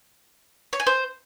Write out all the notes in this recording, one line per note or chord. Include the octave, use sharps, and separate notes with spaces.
C#5
G#5
C5